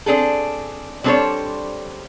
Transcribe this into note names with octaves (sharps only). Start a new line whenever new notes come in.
C4 D4 G#4 A4
G3 C4 D4 A4 C5 C#5